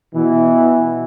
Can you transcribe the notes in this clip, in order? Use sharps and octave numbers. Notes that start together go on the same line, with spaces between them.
B2 E3